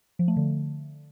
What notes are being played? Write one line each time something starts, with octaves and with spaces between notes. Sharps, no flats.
F3
A3
D3